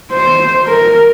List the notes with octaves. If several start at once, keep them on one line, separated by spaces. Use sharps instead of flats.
C5
A#4